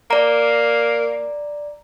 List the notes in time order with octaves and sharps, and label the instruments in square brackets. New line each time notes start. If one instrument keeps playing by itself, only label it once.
[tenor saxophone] A#3 [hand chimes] D5 A#5